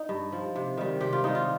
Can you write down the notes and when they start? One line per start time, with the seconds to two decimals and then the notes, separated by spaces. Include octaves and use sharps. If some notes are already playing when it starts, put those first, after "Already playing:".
Already playing: D#4
0.09 G2
0.33 F3
0.56 C3
0.77 D#3 G3
1.00 C3 G4
1.13 F4
1.24 D#3 G3 D#4
1.35 F4